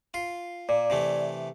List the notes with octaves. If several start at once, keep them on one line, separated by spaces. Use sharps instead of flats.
F4 C6
A#2 D5
C3 E3 A3